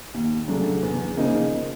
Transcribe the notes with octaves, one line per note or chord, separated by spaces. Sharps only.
D#2
C#3 F#3 A3 D4
E2
C#3 F3 A#3 D#4